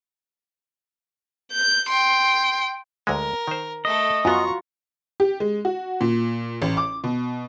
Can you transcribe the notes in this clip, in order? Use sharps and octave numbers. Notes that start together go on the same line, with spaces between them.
G6
G5 C6
D2 D3 G#3 A#4
D#3 C5
A3 A4 D#5
F#2 B3 F4 F#4 A#5 C#6
G4
G#3
F#4
A#2
A1
D6
B2